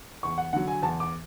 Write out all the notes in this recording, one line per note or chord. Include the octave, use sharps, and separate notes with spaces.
E2 C#6
F#5
D3 F#3 F#5
G#5
E2 A5
D6